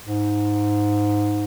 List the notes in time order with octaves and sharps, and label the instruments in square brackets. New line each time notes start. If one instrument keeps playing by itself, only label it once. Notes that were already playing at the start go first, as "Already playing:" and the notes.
[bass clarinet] G#2